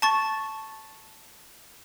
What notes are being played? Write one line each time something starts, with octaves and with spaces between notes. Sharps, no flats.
A5 C#6 A6